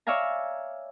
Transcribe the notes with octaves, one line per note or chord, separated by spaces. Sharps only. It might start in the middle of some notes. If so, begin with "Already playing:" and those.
C#5 D5 E5 F5 G#5 A#5